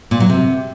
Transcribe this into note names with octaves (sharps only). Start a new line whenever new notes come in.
A#2
F#3
C3